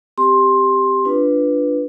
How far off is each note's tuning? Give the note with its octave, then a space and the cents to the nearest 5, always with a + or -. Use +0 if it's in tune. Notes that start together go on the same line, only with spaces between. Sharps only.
C4 +0 G4 +0 C6 +15
D4 +0 F4 -5 B4 +0